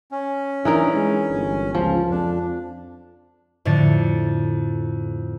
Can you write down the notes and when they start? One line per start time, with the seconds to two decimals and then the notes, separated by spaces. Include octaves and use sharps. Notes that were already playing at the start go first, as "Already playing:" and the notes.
0.12 C#4
0.65 E3 D4 D#4 A#4
0.94 G#3
1.31 G1
1.75 C#2 F3
2.10 F2 D4
3.65 F2 A2 D3 A6 C#7